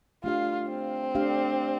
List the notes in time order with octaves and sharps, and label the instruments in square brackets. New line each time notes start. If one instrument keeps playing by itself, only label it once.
[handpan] A3 D4 G4 F5 [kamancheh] F4
[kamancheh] C4
[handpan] A3 D4 G4 F5